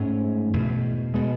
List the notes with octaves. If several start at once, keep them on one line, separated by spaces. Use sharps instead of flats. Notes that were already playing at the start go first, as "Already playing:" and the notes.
Already playing: G#2 A3 C#4
E2 B2
B2 G#3 B3